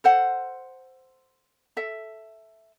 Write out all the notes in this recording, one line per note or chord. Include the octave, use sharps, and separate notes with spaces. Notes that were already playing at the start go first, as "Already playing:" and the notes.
A4 C5 F#5
A4 E5